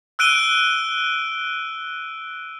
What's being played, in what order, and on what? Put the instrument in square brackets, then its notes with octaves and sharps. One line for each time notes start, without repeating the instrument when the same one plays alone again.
[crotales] E6 F#6 D7 D#7 G7